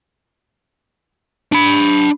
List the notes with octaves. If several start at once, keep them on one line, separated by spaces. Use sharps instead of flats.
D4 B5